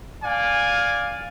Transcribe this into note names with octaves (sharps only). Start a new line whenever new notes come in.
D5 F5 G#5